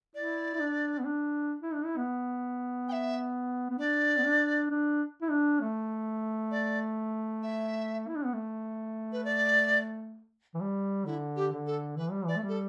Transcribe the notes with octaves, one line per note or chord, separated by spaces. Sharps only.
E4 D5
E4
D4
B3
D4
E4
D4
E4
B3
G5
E5
B3
D4 D5
B3
D4
D4
E4
D4
A3
D5
E5
E4
D4
B3
A3
B4
D5
E3
G3
D3 E4
G4
D3
A4
E3 B4
G3
E3 D5
A3
G3
A4